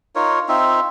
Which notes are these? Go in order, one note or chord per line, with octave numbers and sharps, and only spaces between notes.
D#4 F4 A#4 C#5
C4 D#4 F4 E5